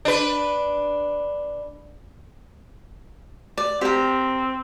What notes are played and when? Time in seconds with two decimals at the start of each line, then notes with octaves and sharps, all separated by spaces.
0.05 D4 B4
3.58 D5
3.81 C4 G4 A#4